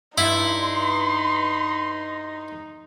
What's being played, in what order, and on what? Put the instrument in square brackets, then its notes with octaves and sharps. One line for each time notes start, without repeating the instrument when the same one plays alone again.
[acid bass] G2 [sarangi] D#4 [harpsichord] E4 [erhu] C6